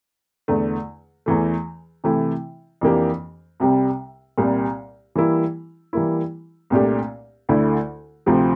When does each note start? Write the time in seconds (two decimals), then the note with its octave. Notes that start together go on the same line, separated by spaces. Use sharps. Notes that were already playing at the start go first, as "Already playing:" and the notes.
0.48 E2 D3 A3
1.26 E2 E3 A3
2.04 C3 E3 A3 E4
2.81 F2 E3 A#3 D4 G4
3.60 C2 C3 G3
4.38 C2 A#2 G3
5.15 E3 G3 A#3 E4
5.93 E3 G3 A#3 E4
6.70 C2 A#2 A3 D4 G4
7.49 D2 D3 A3 E4
8.26 D2 C3 F3 C4 G4